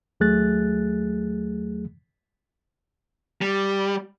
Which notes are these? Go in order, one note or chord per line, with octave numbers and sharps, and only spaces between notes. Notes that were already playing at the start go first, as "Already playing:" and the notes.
D#2 F#3 A3 G#4 F#6 A6
G3